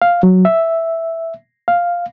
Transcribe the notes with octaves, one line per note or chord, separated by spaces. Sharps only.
F5
F#3
E5
F5